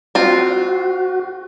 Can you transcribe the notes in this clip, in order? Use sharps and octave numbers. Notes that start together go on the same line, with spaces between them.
C4 F4 F#4